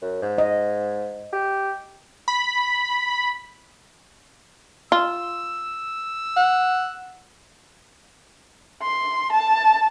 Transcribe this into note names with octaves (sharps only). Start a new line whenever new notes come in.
F#2
G#2
D#5
G4
B5
F4 E6
F#5
C6
A5